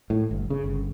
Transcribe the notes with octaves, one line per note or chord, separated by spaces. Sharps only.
A2
G1
C#3
G1